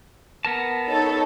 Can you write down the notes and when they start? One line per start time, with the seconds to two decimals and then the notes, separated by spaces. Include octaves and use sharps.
0.45 B3 A#4 A5
0.90 D#4 A4 C#5